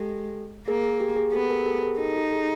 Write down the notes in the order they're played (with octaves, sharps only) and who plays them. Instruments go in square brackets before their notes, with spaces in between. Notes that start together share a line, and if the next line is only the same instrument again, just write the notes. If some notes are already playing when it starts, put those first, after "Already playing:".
Already playing: [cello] G#3 [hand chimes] G4 A4
[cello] A#3 [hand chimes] G#4 A#4
[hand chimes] G#4
G4
G#4
[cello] B3 [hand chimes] G4 A4
[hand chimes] G#4 A#4
G4 A4
G#4 A#4
[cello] D#4 [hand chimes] G4 A4
[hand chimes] G4 A4
G#4